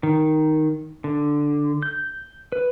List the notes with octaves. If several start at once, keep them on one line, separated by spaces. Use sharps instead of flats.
D#3
D3
G6
B4